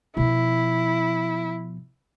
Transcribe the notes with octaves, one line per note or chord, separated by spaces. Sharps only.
B2 F3 E4